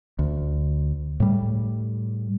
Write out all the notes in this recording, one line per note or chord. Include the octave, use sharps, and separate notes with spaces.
D2
A2 G3